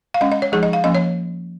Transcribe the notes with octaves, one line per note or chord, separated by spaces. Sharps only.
F5
G#3 C#4 D#5
D#5
C#5
F3 G#3 D#4 G#4
D#5
F5
F3 A#3 C#4 D#5
C#5